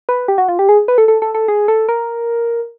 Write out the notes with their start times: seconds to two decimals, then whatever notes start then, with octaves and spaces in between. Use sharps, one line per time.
0.09 B4
0.28 G4
0.38 F#4
0.49 F4
0.59 G4
0.69 G#4
0.88 B4
0.98 A4
1.08 A4
1.22 A4
1.35 A4
1.48 G#4
1.68 A4
1.89 A#4